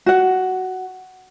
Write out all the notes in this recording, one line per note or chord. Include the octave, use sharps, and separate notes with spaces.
F#4 F#5